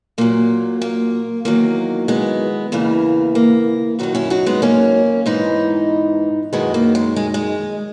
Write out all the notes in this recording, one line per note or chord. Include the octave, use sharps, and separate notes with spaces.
A#2 F#3 A#3
A#3
E2 D#3 F#3 A#3
G#3 B3
E2 C#3 E3 A#3
A#3
F#2 D#3 F#3 D#4 F#4
C#4 E4
D#4 F#4
G#3 B3
A#3 C#4
G#2 E3 B3 D#4
F#2 D#3 F#3 G#3 B3
A#3
G#3
G#3
G#3